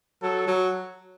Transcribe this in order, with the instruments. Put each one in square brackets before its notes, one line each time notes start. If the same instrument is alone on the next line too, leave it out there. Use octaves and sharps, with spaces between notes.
[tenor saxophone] F#3 [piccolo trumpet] A4
[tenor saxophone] F#3